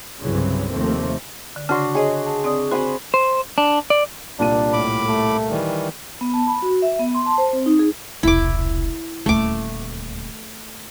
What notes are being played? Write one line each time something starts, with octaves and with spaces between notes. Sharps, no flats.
C2 G2 C#3 E3 F#3 C4
D#2 C3 F3 A3 A#3 C4
D3
C#3 D4 F#4 C6
G#4 C#5 D#5
A5
C4 D5 D#6
C4 F#4 C5 G#5 B5
C5
D4
D5
C2 A#2 D4 D#7
A2 B5 D6
A3
D#3 E3 G3
B3
A5
B5
F#4
E5
B3
C6
A5
C5
C4
D#4
G#4
E1 C2 E4 D6
D#1 D2 A3 D6